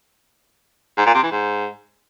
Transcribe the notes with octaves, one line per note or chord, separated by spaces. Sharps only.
G#2
A#2
C3
E3
G#2